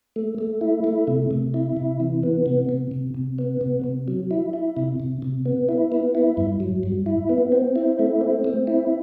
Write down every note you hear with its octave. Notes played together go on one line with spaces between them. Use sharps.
A3
A3
E4
A3
C3
C3
E4
C3
E3
B3
C3
C3
C3
C3
B3
C3
C3
F#3
E4
E4
C3
C3
C3
B3
E4
B3
E4
G2
F#3
G2
E4
B3
C4
E4
A3
C4
C4
E4